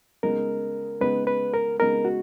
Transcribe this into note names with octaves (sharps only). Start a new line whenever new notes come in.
C#3 G#3 B3 D#4 A#4
C#3 G#3 B3 D#4 B4
B4
A#4
C#3 G#3 B3 D#4 A#4
F#4